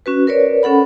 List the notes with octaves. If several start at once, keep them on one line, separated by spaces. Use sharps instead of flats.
C#4 F#4 B4
A#4 B4 C#5 D5
C#4 A4 F#5 B5